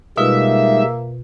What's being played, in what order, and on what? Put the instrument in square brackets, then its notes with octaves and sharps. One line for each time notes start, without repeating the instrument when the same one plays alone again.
[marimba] B2 F4 B4 [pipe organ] G3 G#3 D#4 [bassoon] A#3 [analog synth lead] E5